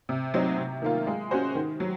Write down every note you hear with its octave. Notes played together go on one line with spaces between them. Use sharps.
C3
F#3 C4 D#4
C3
D#3 A#3 F4
G#3
C#4 F#4 C5
D#3
F#3